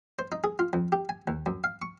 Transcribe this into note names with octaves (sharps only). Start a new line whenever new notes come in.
C5
D#4
G#4
F4
F2
G4
G#5
D#2
F#2
F5
C#6